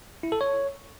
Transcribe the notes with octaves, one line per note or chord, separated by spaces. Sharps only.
E4
A4
C#5